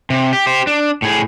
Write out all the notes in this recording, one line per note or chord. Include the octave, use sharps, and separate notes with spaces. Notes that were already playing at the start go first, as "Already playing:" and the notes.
C3
G4
G4 C5
D4
A2 G#4